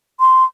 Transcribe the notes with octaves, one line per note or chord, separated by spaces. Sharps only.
C6